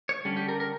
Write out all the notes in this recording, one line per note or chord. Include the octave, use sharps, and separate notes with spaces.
C#5
D3 G3 C#4
G4
A#4
A#4